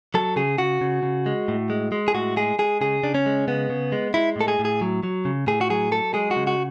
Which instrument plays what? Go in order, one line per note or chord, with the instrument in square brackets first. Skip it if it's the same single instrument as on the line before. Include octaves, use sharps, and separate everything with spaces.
[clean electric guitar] F#3 A4
C#3 G#4
C#3 F#4
C#3
C#3
G#3
A2
G#3
G#3
G#4
A2 F#4
G#3 G#4
G#3 G#4
C#3 G#4
C#3 D4
C#4
G#3
C#3 B3
C#3
G#3
G#3 E4
A2 A4
G#4
A2
G#4
F#3
F#3
C#3
A2 G#4
F#4
F#3 G#4
F#3 A4
G#3 G#4
F#4
C#3
F#4